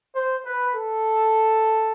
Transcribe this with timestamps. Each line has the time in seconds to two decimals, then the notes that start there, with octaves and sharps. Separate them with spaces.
0.15 C5
0.46 B4
0.75 A4